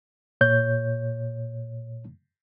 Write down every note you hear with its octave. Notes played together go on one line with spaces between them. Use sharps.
A#2 C#5 G6